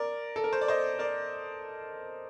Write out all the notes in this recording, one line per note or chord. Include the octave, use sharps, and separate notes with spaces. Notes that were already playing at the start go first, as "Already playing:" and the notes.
Already playing: A#4 D5
A4
A#4
C5
D5
C5 D#5
A#4 D5